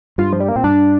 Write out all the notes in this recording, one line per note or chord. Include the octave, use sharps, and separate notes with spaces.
G2 F4
F3
G3
A#3
A#2 C4
G2 D4